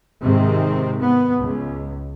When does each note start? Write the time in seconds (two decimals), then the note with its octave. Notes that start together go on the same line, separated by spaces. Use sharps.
0.22 G#2 C3 D#3 C4
1.00 B3
1.37 C#2